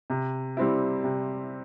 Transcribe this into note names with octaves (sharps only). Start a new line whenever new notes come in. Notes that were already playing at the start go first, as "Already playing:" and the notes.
C3
G3 C4 E4
C3